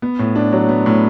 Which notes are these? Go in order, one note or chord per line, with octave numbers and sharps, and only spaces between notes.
B3
A2
D4
F#3
B3
A2